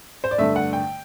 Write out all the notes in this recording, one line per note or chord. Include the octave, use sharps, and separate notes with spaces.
C5
D5
G2 D3 A3 E5
F#5
G5